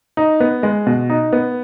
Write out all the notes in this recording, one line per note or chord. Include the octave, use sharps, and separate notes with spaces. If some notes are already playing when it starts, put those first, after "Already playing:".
D#4
B3
G#3
B2
D#4
B3